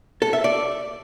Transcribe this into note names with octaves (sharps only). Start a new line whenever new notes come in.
A4
E5
D5